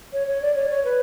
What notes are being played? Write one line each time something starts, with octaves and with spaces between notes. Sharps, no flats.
C#5
C#5
D5
C#5
C#5
B4